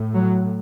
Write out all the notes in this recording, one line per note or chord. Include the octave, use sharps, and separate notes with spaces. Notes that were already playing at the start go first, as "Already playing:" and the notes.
Already playing: A2
F#3